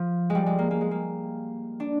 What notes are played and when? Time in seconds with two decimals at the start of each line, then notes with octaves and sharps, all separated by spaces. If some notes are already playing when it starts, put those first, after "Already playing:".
Already playing: F3 F4
0.30 G#3
0.35 G3
0.46 G#3
0.59 A#3
0.71 A#3
0.81 G#3
0.91 A#3
1.80 D4